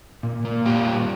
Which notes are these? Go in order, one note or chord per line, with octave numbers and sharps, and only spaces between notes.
A#2
A#3
A#2 F4 G4
G3